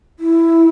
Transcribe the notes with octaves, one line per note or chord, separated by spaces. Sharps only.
E4